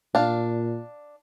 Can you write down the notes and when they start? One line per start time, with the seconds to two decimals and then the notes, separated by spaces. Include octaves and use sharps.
0.15 A#2 D4 F5